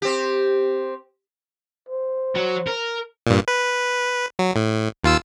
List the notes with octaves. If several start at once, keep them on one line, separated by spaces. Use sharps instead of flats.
C4 G4
C5
F#3
A#4
G2 A#2
B4
F#3
A2
D#2 F4 E6